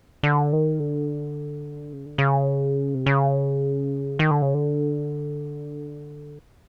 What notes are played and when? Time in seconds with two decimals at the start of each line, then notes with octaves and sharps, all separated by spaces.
0.23 D3
0.53 D#3
0.80 D3
1.93 C#3
2.06 D3
2.18 C#3
2.95 C3
3.06 C#3
4.19 D#3
4.31 D3
4.42 C#3
4.54 D3